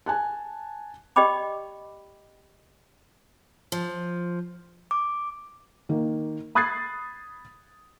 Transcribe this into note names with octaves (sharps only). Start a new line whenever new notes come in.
G#5 A5 F#6
G4 D5 D#5 G5 B5 D6
F3
D6
D#3 A#3
B5 D#6 F#6 G#6 A6 C7